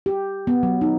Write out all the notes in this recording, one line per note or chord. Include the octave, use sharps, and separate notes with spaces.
G4
B3
F#3
D#4